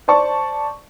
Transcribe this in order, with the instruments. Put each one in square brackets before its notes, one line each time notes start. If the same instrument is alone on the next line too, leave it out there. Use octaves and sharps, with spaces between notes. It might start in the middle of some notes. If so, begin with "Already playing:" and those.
[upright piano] C5 D5 A5 C#6